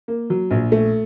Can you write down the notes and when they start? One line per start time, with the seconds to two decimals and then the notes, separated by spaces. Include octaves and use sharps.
0.08 A#3
0.30 F#3
0.51 A#1
0.72 A3